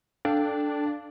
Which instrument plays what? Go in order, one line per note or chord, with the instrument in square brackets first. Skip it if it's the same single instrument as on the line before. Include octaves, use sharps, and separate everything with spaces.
[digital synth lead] D4 [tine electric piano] A4 F5 G5